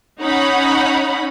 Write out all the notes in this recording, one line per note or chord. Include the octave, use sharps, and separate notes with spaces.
C#4 D#4 C#5 F#5 B5